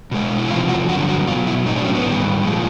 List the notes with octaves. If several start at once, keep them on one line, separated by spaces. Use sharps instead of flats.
B2 G#3
E4
E2 C3 F3 F4
F#4
G2 D3 F#3 F#4
F#4
B2 F#3 F4
E4
A2 F#3 D#4
D4
C#4
B3
G#2 D#3 G3
A#2 F3 G#3